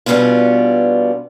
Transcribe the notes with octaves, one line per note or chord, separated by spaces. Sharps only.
B2 G3 B3 C#4 D4 F4